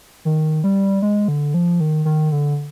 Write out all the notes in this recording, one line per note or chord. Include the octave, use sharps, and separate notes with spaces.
D#3
G3
G#3
D3
F3
D#3
D#3
D3